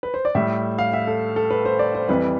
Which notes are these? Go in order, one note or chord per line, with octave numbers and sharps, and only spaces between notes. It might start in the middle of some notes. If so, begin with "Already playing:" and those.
B4
C5
D5
A2 G3 E5
F5
E5
A4
A4
B4
C5
D5
C5
F2 E3 G3 B4